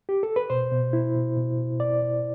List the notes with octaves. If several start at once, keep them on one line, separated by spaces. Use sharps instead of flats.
G4
A4
B4
B2 C5
B2
E4
B2
B2
B2
B2 D5
B2